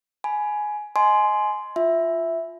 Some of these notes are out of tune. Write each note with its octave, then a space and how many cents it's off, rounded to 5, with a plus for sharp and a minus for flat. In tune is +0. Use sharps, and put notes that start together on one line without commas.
G#5 +15 B5 +0
D#5 +0 G#5 +25 C6 -5
F4 +0 E5 +0